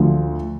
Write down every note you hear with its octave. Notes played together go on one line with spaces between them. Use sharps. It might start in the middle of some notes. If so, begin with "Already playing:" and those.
Already playing: D2 D3 F3